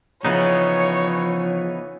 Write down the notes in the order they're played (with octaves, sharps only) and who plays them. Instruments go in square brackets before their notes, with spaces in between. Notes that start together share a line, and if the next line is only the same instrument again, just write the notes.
[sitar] C#3 [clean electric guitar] E3 B3 D#4 [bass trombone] F3 [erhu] C#5